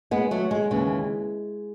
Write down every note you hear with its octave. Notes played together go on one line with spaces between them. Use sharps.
G#3 B3
F#3 A3
G#3
D#2 C#3 E3